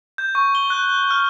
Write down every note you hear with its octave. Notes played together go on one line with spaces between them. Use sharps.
G6
C#6
G7
F#6
F6